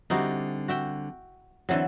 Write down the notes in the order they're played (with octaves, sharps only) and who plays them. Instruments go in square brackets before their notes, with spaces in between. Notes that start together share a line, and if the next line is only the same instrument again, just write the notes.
[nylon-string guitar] D3 G3 C4 [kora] D#4 E4 F#4
[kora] F#4 E5 G5
[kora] D3 E3 F#3 [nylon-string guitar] C4 A4